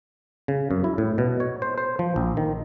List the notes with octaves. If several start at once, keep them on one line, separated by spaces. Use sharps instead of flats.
C#3
F#2
E4
A2
B2
C#5
C5
C5
F3
A#1
D#3